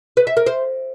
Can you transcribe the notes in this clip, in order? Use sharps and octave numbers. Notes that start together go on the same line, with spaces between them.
B4
E5
A#4
C5